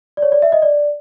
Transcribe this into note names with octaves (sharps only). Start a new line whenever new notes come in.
D5
C#5
D5
E5
D#5
D5